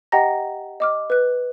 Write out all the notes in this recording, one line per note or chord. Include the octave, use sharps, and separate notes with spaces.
G4 D#5 F#5 G5 A#5 A#6
D#5 D6 F6
B4 F#6